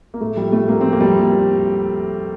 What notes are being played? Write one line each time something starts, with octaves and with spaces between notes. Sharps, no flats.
A#3
A2 A3
F3 G3
A2 A3
A2 A#3
F3 C4
A#3
F3 G3